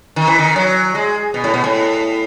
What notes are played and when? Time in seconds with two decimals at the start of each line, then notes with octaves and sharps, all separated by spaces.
0.16 D#3
0.28 E3
0.39 D#3
0.56 F#3
0.95 G#3
1.34 B2
1.44 A2
1.54 B2
1.64 A2